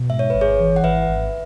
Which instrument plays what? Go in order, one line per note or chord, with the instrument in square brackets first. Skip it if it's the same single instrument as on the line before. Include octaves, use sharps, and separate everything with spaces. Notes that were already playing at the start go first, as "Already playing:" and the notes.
Already playing: [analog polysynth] B2
[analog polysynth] G#2 [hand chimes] E5
[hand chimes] C#5
[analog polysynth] G#1 [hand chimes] B4
[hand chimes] G#4 C#5
[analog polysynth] E3
[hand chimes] F#5
[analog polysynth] G#1 [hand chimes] B4 E5
[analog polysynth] G#1